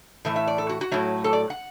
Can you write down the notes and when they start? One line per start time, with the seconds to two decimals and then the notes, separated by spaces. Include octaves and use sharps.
0.25 A2 E3 A3 E5
0.36 E5
0.47 D5
0.58 A4
0.69 F#4
0.81 F#4
0.91 A2 F#3 A3
1.24 A4
1.33 D5
1.50 F#5